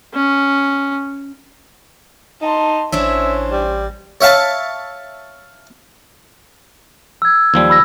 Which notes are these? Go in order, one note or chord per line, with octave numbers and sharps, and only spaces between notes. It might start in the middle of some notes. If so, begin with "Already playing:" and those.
C#4
D#4 A5 C6
A1 C#4 D4 E4 C5 C#5 E5
G3
C#5 E5 F5 A5
E6 G#6
D#2 F3 G3
B5 E6 A#6